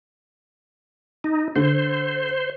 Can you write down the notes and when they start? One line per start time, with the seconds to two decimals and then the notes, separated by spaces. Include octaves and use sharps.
1.24 D#4
1.56 D3 C5